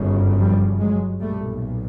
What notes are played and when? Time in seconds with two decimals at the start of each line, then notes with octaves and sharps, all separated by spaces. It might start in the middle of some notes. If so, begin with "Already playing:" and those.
Already playing: G1 F#2 C#3
0.39 F3 G3
0.80 F#3 G#3
1.21 B1 A#2 G3 A3